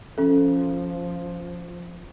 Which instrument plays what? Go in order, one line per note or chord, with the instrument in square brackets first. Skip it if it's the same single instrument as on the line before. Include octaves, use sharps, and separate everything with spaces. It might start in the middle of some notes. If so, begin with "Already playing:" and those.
[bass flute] F3 [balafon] C#4 A4